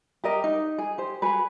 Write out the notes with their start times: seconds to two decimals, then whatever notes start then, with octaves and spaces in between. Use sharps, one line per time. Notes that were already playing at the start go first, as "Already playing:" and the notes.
0.24 G4 A#4 D#5
0.44 D#4
0.78 G#4
0.98 G4 C5
1.22 F#4 G#4 B4